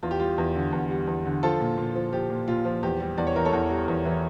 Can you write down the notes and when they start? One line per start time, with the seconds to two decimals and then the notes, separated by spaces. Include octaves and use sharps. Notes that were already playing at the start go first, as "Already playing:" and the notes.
0.03 E2 F4
0.11 G4
0.20 G3 F4
0.38 E2
0.55 D3
0.73 E2
0.90 G3
1.07 E2
1.25 D3
1.43 F3 F4 A4
1.60 A#2
1.78 A#2
1.95 F3
2.13 F3 G4
2.30 A#2
2.48 A#2 F4
2.65 F3
2.83 E2 G4
3.00 G3
3.18 E2 D5
3.27 C#5
3.35 E3 A#4
3.45 A4 C#5
3.53 E2
3.70 G3
3.88 E2
4.05 E3